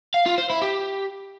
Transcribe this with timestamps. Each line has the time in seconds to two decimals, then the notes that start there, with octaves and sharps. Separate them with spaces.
0.14 F5
0.26 F4
0.38 C5
0.50 E4
0.62 G4